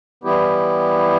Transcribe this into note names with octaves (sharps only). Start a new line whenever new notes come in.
E3 G3 B3 E4 G4